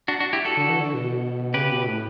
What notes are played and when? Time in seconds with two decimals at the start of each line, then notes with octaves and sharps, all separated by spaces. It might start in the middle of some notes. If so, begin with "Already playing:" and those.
0.08 D4 F#4
0.20 D4 F#4
0.33 E4 G4
0.45 F#4 A4
0.57 D3
0.69 E3
0.81 D3
0.94 B2
1.54 C#3 G4 B4
1.71 B2
1.86 A2